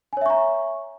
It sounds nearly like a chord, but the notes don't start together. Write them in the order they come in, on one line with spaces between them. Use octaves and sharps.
G#5 C#5 E5 C#6 A#5